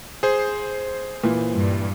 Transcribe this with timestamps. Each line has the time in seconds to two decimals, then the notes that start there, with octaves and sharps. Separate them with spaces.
0.23 G#4 C5
1.24 A#2 E3
1.54 G2